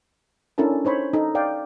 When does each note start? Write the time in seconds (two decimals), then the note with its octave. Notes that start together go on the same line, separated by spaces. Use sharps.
0.58 C#4 D4 E4 A4 A#4 A5
0.85 D#4 C5 C#5 B5
1.13 D#4 A4
1.35 D5 F5 G5